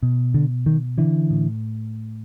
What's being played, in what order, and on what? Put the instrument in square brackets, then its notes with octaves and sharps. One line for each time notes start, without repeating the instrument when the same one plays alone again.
[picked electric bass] B2
D3
D#3
D3 E3
A2